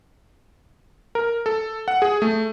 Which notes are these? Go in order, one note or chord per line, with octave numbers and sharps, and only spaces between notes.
A#4
A4
F#5
G#4
A3